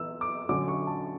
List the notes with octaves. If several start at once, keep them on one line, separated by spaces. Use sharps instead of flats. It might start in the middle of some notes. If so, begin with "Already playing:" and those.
Already playing: E3 B3 E6
D6
D3 F#3 C#4 D6
C#6
A5